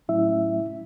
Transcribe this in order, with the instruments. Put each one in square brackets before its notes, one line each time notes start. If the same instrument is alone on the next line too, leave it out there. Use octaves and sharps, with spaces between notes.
[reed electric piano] A2 F#3 A3 C#4 E4 E5